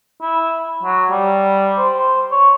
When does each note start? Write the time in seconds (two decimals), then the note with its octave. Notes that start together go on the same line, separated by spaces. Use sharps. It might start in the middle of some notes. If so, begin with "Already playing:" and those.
0.22 E4
0.83 F#3
1.11 G3
1.78 C5
2.31 C#5